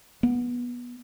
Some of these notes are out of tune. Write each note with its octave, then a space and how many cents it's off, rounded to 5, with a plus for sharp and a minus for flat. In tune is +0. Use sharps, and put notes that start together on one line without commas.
B3 -20